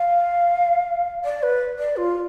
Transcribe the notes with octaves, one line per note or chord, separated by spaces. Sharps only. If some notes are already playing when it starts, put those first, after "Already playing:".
Already playing: F5
D5
B4
D5
F4